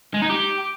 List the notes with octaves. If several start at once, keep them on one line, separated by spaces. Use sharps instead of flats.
G#3
D#4
G4